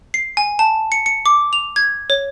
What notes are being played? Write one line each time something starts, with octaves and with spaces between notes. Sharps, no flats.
C7
G#5
A5
C#7
C#7
D6
F7
G#6
C#5